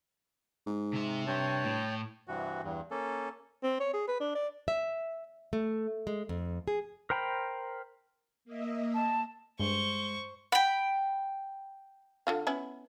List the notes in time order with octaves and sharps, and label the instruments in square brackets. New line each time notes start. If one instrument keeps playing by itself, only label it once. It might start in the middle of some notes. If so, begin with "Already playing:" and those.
[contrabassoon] G#2
[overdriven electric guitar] C3 E5
[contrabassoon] G2 [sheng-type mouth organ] C#5 G5 A5
[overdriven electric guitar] A2
[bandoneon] G2 C3 E3 F#4
E2 G2
A#3 C#4 A4
[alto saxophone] C4
C#5
G#4
B4
D4
D5
[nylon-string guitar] E5
A3
G#3
F2
G#4
[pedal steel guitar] A#4 C5 G5 A#5 B5
[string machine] A#3 D#5 E5
[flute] A5
[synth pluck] G2 [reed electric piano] G#3 [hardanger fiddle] C5 C#6 [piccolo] G7
[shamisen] F#5 [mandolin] G5 B5
[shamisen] D3 F4 F5
B3 C#4 E4